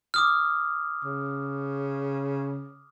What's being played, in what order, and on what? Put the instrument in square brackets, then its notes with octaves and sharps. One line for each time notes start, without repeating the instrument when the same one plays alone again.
[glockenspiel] D6 D#6 F6
[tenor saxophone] C#3